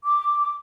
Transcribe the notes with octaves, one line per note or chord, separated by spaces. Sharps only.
D6